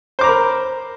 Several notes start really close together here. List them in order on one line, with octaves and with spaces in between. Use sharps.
C5 D6 A#5 B5 A#4